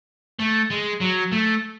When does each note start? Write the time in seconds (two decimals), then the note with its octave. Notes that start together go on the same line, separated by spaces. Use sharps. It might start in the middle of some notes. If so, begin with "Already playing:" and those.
0.40 A3
0.71 G#3
1.01 F#3
1.33 A3